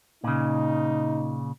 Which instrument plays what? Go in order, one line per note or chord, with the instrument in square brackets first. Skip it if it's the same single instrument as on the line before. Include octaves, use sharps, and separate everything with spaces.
[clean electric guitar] A#2 C#3 [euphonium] D#4